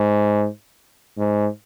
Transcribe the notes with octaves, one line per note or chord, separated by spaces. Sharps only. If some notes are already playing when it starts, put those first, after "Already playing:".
Already playing: G#2
G#2